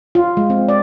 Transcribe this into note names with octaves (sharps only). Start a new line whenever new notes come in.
F4
G#3
C4
D5